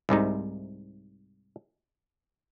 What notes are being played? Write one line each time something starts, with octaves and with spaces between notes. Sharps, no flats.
C2 G#2 C3 D#4